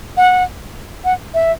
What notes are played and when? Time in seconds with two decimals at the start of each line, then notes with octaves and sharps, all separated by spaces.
0.17 F#5
1.04 F#5
1.34 E5